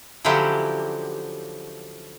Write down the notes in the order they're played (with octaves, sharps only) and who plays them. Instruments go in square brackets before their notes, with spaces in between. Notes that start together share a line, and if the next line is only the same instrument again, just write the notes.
[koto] D3 F3 F#3 C#4 E4 G4